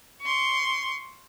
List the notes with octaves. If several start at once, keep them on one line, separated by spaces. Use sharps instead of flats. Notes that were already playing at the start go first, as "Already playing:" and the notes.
C6 C#6